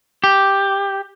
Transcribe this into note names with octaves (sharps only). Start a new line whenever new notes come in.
G4